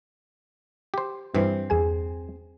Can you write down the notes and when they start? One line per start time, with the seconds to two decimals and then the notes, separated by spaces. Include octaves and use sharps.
0.94 G4 C5
1.35 G2 E3 C4
1.70 E2 G#4 G#5